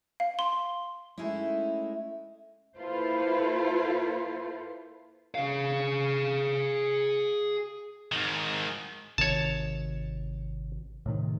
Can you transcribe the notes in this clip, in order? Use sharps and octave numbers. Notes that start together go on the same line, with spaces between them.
F5
C6
G#3 A3 C#4 D#4 E4
A#3 E4 F4 A4 B4 C5
G#4 F5
G#2 D#3
G#1 C3 D#3 C#5 A5
A2 C3 D#3